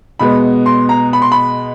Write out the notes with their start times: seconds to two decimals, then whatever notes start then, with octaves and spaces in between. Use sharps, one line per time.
0.19 B2 G#3 B3 B5
0.66 C6
0.89 A#5
1.13 B5
1.22 C6
1.32 B5